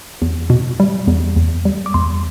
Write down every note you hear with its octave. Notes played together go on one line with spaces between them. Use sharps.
E2
B2
G3
E2
E2
G3
D6
E2 C6